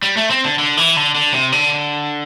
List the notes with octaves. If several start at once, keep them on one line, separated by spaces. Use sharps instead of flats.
G3
A3
C4
D3
D3
E3
D3
D3
C3
D3